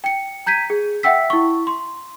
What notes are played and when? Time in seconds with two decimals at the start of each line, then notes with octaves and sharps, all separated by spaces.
0.04 G5 C#7
0.46 A#5 G6 G#6 B6 D#7
0.70 G#4
1.03 E5 F#5 G5 E6 B6
1.30 E4 C#6
1.67 C6